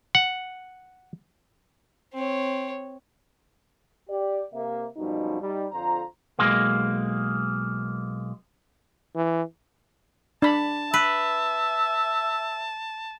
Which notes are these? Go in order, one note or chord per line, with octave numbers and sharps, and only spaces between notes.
F#5
C4 C#5
G4 D5
C3 A#3 A#4 E5
F#2 B2 F3 G3 D#4
G3 D#4
F2 D3 F4 C5 A#5
B1 G#3 A#3
E3
D4 A5 B5
B4 E5